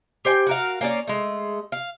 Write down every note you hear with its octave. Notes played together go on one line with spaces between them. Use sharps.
G4 C5 G5 G#5
F#4 A#4 F5
A#3 C#4 F#4 D5
G#3 A3
F5